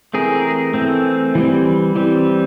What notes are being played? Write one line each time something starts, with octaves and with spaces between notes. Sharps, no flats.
E3 A3 C4 G#4 A#4
E3 A3 C4
E3 G3 C4
E3 G3 C4